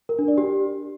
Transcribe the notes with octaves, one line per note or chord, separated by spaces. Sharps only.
A#4
D4
D5
G4